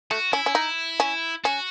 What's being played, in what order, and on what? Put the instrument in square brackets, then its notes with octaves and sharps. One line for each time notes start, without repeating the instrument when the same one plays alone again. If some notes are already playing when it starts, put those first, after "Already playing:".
[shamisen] A3 [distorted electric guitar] F#4
[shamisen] C#4 [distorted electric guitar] E4
[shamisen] C#4
D#4
C#4
[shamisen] C#4 [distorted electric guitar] F#4